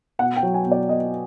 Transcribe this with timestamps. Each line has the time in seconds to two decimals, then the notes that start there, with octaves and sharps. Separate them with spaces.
0.19 B2 F#5
0.37 G5
0.43 F#3
0.54 G#5
0.65 B2
0.71 D5
0.89 B3 D#5